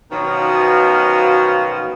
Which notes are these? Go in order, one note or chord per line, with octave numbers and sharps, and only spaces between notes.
B2 D#3 F3 F#3 C#4 F4